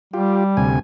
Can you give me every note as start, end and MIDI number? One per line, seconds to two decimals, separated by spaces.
0.13 0.79 55
0.13 0.44 65
0.13 0.44 67
0.57 0.79 38
0.57 0.79 48
0.57 0.79 80